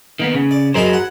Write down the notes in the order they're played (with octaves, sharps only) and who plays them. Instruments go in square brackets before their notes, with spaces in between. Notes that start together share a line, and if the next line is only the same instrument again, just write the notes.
[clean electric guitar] D#3 A#3 B3
C#3
[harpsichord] D5
[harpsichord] F#2 D#4 B5 [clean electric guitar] G#4 A#4 C5
[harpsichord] F#5